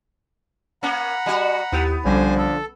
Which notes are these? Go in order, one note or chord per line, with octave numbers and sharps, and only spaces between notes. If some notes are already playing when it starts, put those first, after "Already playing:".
A#3 C#4 F#5 A#5 B5
G3 F#4 D#5 G#5
D#2 B3 E4 G4
B1 D3 F3 G3 C#4 C5 G#5
A4